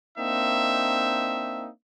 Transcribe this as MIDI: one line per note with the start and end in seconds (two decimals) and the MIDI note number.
0.18 1.69 58
0.18 1.69 60
0.18 1.69 62
0.18 1.69 63
0.18 1.69 76